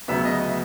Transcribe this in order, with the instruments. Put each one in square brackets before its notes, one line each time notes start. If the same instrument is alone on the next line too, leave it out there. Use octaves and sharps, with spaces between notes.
[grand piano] D2 C#3 F#3 B3 E5
D#5